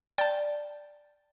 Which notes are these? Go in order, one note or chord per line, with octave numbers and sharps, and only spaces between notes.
D5 G5 A5